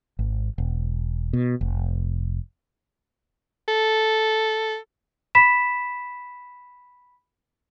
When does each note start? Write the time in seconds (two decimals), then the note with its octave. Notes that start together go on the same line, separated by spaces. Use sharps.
0.19 G#1
0.58 E1
1.33 B2
1.61 F1
3.68 A4
5.35 B5 B6 E7